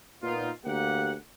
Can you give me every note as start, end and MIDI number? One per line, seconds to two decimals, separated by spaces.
0.22 0.49 46
0.22 0.49 59
0.22 0.49 63
0.22 0.49 65
0.65 1.13 38
0.65 1.13 58
0.65 1.13 67
0.65 1.13 78